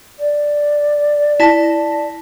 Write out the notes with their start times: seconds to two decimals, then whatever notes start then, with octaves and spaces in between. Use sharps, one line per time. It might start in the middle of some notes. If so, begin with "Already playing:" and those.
0.19 D5
1.40 E4 A5 A#6